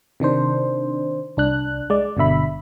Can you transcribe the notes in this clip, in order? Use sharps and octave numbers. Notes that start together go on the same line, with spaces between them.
C3 D#3 D4 C5
C2 D4 F#6
G#3 D5
G1 B2 D3 E5 B5